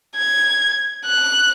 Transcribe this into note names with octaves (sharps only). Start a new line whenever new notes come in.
G#6
F#6